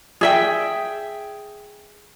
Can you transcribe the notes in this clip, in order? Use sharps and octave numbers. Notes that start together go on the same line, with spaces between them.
G#4 E5 G5